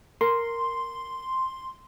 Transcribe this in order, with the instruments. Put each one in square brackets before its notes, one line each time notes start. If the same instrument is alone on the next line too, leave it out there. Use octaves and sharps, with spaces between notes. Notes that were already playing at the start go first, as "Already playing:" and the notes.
[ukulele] A#4 [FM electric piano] C6